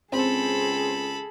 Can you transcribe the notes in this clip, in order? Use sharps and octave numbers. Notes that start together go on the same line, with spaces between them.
C#2 C4 G#4 A4 B5